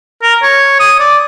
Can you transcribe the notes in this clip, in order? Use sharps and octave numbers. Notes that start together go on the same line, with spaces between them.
A#4
C#5
D#6
D5